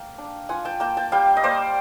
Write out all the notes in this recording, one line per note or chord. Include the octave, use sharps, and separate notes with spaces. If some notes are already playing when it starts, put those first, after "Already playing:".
Already playing: A#3 F5 G5
D4
F4 F#5 G#5
G5 A5
A#3 G5 A5
G5 A5
G3 F5 G5
D#5
A#3 C5 D5